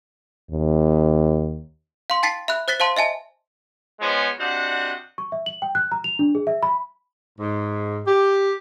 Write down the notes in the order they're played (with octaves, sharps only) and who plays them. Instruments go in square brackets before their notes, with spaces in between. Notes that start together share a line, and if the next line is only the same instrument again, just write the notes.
[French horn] D#2
[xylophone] F5 C6
G5 A5 A6 B6 C7
E5 B5 F#6
C5 F#6 A6 B6 G7
C5 F5 A5 C6
D#5 E5 G#5 A5
[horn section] F3 G#3 B3 C#4 C5 C#5
C3 D4 F#4 C5 D#5 F#5
[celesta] C#6
E5
F#7
G5
F#6
A#5
F7
D4
G#4
E5
B5
[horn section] G#2
G4